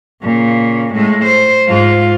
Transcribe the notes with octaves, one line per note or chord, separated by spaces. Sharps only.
A#2 C#3
A2 G#3
C5
G#2 F4